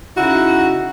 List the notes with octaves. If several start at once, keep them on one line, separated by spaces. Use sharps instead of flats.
C#3 D#4 E4 F#4